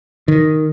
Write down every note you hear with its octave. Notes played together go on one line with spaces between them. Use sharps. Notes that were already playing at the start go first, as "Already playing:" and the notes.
D#3